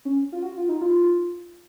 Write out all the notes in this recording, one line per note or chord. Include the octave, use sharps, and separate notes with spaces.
C#4
F4
F#4
F4
D#4
F4